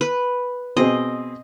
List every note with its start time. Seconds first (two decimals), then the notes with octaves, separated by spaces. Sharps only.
0.01 B4
0.77 B2 C4 G#4 D#5